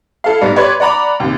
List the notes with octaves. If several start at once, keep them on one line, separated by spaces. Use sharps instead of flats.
E4 A4 F5
G#2 G3 B3
G4 B4 C#5 D5 C6
D5 F#5 A#5 B5 D6
D#2 C3